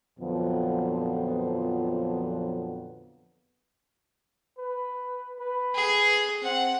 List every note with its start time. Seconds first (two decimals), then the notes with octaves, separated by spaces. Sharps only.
0.20 F2 A#2 D3 F3 F#3 B3
4.58 B4
5.40 B4
5.75 G#4
6.43 C4 F#5